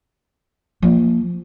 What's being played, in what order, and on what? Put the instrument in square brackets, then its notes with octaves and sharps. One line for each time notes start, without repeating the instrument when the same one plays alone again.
[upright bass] F3 A#3